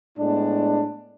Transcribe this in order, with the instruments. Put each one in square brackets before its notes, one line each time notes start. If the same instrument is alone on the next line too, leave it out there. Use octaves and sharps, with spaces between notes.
[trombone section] A2 G#3 B3 D4